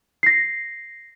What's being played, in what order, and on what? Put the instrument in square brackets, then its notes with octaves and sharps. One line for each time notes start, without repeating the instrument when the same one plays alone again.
[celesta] A#6 C7